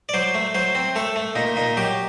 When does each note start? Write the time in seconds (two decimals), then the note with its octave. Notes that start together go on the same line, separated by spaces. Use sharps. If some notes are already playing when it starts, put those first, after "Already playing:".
0.09 D5
0.14 F#3 C5
0.34 A3
0.54 F#3 C5
0.75 C4
0.96 A3 A4
1.16 A3
1.35 A#2 D#4
1.56 A#2 D#4
1.77 F#3 G4